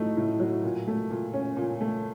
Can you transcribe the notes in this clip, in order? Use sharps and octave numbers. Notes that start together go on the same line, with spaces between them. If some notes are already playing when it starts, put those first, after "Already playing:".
Already playing: A2 F#3 A3 D#4
A2
F#3
A#2
A3
A#2
C#4
A#2
A3